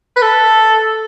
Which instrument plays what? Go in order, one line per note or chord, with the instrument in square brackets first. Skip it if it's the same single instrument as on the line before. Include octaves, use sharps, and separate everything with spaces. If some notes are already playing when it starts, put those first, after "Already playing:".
[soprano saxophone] B4
A4